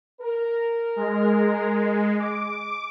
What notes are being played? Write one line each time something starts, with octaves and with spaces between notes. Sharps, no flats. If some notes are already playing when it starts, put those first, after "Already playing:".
A#4
G#3
D6